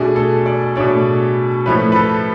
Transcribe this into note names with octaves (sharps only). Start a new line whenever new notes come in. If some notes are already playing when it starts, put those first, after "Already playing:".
Already playing: B2 A3 D4 G#4
A4
D5
B2 A3 D4 C#5
A2 F3 A3 C#4 B4
B4
A4